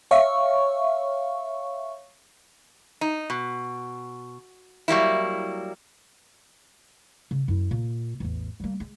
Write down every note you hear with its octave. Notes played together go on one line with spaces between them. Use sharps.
C#5 E5 F5 C#6
D#4
B2
F#3 G3 A#3 E4
C#3
F#2 E4
A#2
A1 E2
G3 A#3
G#3